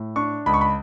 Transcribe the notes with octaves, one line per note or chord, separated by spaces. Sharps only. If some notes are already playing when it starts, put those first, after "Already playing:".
Already playing: A2
D4 C#6
C#2 B5
C#6
B5